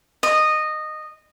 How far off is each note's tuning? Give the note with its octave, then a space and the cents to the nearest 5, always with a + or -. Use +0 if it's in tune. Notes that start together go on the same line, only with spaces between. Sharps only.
D#5 -15